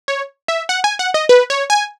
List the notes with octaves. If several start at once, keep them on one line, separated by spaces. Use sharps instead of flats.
C#5
E5
F#5
G#5
F#5
D#5
B4
C#5
G#5